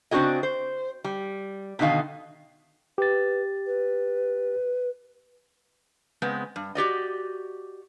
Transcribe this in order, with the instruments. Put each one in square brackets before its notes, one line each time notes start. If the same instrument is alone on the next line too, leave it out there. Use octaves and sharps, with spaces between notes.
[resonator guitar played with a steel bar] C#3 C4 D4 F#4 G#4 D#5
C5
G3
B2 D3 D#3 D#4 F5
[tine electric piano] G4 A6 [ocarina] B4
[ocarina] B4
[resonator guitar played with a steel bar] C#3 G#3 B3 C4
G2
F#4 G4 D5 D#5